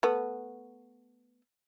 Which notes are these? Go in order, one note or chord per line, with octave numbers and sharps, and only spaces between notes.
A3 B3